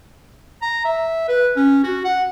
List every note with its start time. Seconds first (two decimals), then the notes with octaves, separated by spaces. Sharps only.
0.62 A#5
0.85 E5
1.28 B4
1.56 C#4
1.84 F#4
2.05 F#5